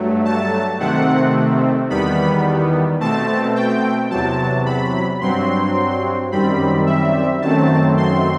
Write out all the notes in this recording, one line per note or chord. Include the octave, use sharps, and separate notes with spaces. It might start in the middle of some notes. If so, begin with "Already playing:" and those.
Already playing: G2 F#3 A3
A5
C3 D#3 A3 C4 F#5
E2 D#3 G3 B3 B5
B2 A3 C4 A5
G5
E2 C3 F#3 A5
B5
G2 F#3 C4 C6
F#2 D#3 G3 C4 B5
E5
F#2 D#3 F#3 A3 C4 A5
C6